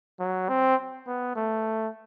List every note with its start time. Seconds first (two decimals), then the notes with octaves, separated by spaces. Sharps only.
0.20 F#3
0.49 C4
1.07 B3
1.36 A3